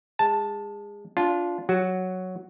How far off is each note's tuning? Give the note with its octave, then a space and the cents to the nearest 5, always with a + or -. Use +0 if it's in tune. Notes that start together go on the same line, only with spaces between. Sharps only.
G#3 -25 A5 +0
D4 -20 F4 +0
F#3 +0 F#4 +0